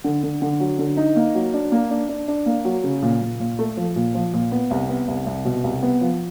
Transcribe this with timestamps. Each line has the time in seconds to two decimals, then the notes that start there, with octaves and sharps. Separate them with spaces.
0.04 D3
0.23 D3
0.42 D3
0.60 F#3
0.79 D3
0.97 D#4
1.16 A#3
1.35 F#3
1.54 D4
1.72 A#3
1.91 D4
2.09 D4
2.28 D4
2.46 A#3
2.65 F#3
2.84 C#3
3.02 A#2
3.21 A#2
3.40 A#2
3.59 A3
3.77 F3
3.96 A#2
4.15 F3
4.33 A#2
4.52 B3
4.71 C2
4.89 B3
5.08 C2
5.26 C2
5.45 B2
5.64 C2
5.83 B3
6.01 F3